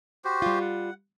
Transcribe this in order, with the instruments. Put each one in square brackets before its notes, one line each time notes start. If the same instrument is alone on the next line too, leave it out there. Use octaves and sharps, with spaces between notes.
[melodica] F#4 G4 C5
[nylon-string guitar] G3 F4
[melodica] F#5